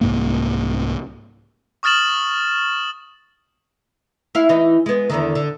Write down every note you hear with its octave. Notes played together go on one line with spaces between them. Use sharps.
C2 G#2 A#3
C#6 D#6 F6 A6 E7 F#7
E4 F5
E3 D#4
G#3 B3
E2 D3 D#3
D3